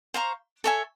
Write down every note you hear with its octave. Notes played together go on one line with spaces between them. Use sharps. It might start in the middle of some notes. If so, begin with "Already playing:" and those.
C5 F5 A#5 C#6
A4 C#5 E5 G#5